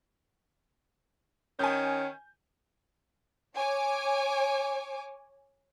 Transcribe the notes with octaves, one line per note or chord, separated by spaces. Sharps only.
D#3 C#4 G#5 G6
C#5 G#5 D6